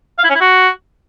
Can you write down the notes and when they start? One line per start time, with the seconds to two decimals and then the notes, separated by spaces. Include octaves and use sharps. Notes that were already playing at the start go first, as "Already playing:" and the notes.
0.19 F5
0.24 E4
0.29 C#4
0.35 E4
0.40 F#4